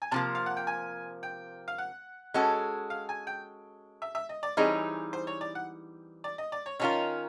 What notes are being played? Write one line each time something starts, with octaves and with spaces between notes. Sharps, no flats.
G#5
C3 F3 A#3 A5
F5
F#5
G5
G#5
G5
F5
F#5
G#3 C#4 F#4 A4
F5
G#5
G5
E5
E5
D#5
D5
E3 G3 C4 D#4 G#4 C#5
C5
C#5
D5
F#5
D5
D#5
D5
C#5
D#3 G#3 C#4 F4 A#4 C#5